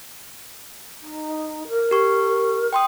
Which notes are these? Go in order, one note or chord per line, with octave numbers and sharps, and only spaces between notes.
D#4
A#4
G4 C#6
G5 C6 D#6